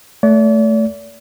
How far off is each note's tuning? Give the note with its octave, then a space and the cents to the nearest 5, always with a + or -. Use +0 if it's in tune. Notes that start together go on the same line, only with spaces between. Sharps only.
A3 +0 D5 -40